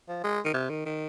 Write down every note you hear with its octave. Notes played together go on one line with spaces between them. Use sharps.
F3
G#3
D#3
C3
D#3
D#3